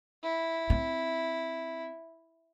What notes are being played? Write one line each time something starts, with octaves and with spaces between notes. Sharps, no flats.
E4
C4